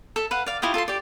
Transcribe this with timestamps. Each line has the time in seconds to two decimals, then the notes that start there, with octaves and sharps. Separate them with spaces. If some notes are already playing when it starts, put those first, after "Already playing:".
0.16 A4 E5
0.31 B4 F5 F#5
0.46 D5 F5
0.62 E4 F4 G4 D#5
0.74 F4 A4 A5 C6
0.88 G4 D5